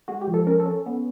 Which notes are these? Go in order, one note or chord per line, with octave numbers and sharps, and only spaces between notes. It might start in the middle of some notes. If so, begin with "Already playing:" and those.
G#3 F#4
G4
F3
A4
C#4 A#4
A4
C#4
B3